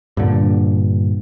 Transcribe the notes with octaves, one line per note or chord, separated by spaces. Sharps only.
G2 A#2 D3